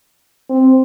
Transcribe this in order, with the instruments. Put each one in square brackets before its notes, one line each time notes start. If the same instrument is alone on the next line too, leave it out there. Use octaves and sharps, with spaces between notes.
[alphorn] C4